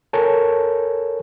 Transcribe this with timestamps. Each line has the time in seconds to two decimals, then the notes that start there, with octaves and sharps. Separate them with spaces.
0.13 A4 A#4 C#5 G#5 A5